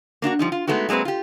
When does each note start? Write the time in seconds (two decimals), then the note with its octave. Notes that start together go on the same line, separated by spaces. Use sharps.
0.22 A#3 D4 F4 F#4
0.39 F3 G3 D#4
0.52 F4
0.67 G#3 A3 B3 D#4 F#4
0.89 F#3 G#3 A#3 C4 B4
1.05 F4 G4